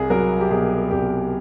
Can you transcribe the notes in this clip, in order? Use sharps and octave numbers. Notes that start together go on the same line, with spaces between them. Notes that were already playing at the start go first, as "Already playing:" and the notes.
Already playing: C2 G#4
F#3 A#4
G4
B2 G#4
C2 G4